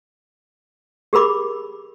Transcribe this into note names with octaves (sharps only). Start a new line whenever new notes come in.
G4 G#4 A#4 B5 D6